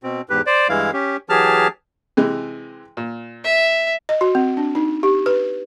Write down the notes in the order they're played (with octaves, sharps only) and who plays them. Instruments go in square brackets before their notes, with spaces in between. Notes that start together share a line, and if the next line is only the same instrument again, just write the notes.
[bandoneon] B2 C4
E2 G#2 G4 B4
C5 D5
G2 E3 G#3 E4 F5
C#4 G4
E3 F#3 G4 G#4 A5 F6
[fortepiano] C3 E3 G#3
A#2
[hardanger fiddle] E5
[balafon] D#5
F#4
C4
D4
D#4
G4
B4